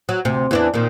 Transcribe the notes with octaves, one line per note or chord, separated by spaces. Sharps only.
F#3
D2 C3
E2 E3 D4
A#2 D#3